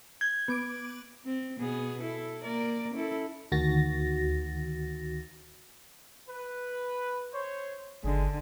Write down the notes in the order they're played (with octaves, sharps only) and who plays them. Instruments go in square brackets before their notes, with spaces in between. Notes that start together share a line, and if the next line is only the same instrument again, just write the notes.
[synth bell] G6 [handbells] G#6
[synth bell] B3 D6 D7
[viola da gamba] C4
B2 B3 G#4
E4 A4
A#3 A#4 D5
C#4 E4 A4
[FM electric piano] D2 D#3 F#4 A6 A#6
[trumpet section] B4
C5 C#5
[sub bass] G1 [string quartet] D3 [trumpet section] G#3 G#4